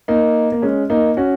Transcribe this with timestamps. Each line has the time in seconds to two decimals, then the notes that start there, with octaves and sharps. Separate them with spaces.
0.08 A#3 D#4
0.52 A#3
0.62 G#3 C#4
0.90 A#3 D#4
1.17 C#4 F#4